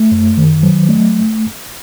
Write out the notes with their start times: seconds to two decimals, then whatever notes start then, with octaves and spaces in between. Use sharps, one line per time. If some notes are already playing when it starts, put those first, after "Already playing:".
Already playing: A3
0.12 F#2
0.37 D#3
0.63 F#3
0.89 A3